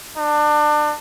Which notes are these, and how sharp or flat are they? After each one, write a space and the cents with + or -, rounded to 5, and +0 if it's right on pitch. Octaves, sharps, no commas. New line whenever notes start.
D4 +30